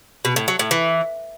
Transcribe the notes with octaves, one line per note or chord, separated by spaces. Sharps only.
B2
A2
F#3
A2
E3